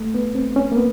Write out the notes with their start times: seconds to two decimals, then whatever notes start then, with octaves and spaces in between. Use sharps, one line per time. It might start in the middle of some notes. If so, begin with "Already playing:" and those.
Already playing: A3
0.14 B3
0.35 C4
0.56 C#4
0.72 A#3
0.77 B3